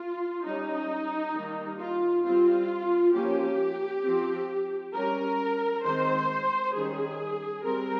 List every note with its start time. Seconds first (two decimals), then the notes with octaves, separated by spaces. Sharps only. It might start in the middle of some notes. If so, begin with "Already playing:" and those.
Already playing: F4
0.45 G3 C#4 D#4
1.35 D#3 G3 A#3
1.80 F4
2.25 G3 C4 F4
3.14 F3 A#3 C#4 G4
4.05 F3 C4
4.94 G3 C#4 A#4
5.84 D#3 G#3 C4 C5
6.75 D#3 G3 C#4 G#4
7.65 G3 C4 A#4